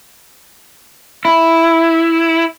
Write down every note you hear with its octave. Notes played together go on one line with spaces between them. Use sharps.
E4